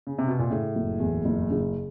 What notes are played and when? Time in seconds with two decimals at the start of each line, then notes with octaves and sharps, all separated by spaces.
0.07 C#3
0.19 C3
0.28 B2
0.39 A#2
0.50 A2 C#3
0.75 F#1
1.00 E2
1.25 F#1
1.51 C#3